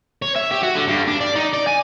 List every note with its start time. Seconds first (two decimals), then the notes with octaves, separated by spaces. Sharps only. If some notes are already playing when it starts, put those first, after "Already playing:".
0.22 C#5
0.36 E5
0.51 G4
0.62 F#4
0.75 D3
0.87 G2
1.08 D4
1.21 D5
1.36 D#4
1.53 D5
1.67 G#5